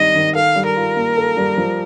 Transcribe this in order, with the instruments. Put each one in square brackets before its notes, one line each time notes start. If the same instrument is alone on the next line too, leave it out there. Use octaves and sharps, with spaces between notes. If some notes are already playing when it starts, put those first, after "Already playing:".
Already playing: [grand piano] D#3 G3 C4 D#4 [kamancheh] D#5
[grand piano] D#3
[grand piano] A4 [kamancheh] F5
[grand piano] G3
[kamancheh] A#4
[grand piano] F4
A#3
A4
G3
F3